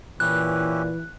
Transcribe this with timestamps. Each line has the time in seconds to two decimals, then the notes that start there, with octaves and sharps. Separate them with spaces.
0.20 A#2 E3 C#4 E4 G4 F#6